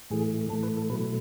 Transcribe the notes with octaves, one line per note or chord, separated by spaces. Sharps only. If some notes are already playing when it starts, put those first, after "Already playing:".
A2 E3 A3 G#4
A2 E3 A3 A4
B4
A4
B2 F#3 A3 B4